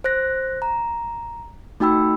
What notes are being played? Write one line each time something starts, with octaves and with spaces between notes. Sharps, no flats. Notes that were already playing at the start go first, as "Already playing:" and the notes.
C5 F#6 A#6
A#5
A3 D#4 F#4 G5 B5 E6